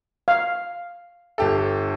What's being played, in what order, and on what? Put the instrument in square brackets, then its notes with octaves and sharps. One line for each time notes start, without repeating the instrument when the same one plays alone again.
[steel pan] F5
[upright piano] G1 G4 A4